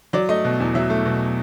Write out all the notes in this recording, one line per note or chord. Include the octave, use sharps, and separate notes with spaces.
F#3 D5
A3 D#5
B2
E2
F#3 E5
A3
B2